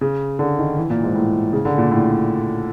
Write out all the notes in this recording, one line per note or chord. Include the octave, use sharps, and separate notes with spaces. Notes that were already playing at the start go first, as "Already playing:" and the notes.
C#3
D3
D#3
E3
A#2
G#2
A2
C#3
D3
A#2
A2